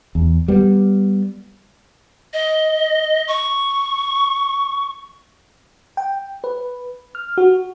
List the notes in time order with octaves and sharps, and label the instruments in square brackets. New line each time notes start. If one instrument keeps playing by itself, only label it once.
[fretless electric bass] E2
G3 B3
[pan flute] D#5
C#6
[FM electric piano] G5
B4
F6
F#4